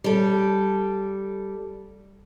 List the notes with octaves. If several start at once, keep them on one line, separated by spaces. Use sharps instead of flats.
G3 A4